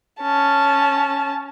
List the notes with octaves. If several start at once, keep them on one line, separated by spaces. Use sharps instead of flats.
C#4 A5